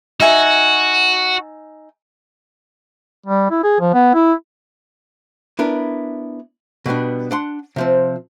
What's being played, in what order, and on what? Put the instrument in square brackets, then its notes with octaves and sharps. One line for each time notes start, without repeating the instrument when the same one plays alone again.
[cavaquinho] D#4 E5 G#5 [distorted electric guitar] F#4
[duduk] G3
E4
G#4
F3
B3
E4
[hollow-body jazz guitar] B3 D4 E4 A#4
B2 G3 B3 D4
D4 F#5 C6
C3 F3 C4